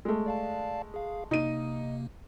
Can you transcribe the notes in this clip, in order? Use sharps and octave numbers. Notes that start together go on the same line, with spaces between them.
G#3 A3
D5 F5 A5
G#4 F5
C3 A#3 D#4 D#7